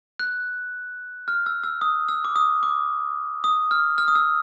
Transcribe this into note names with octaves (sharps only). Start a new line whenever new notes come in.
F#6
F6
E6
E6
D#6
E6
D6
D#6
D6
D#6
F6
F6
D#6
E6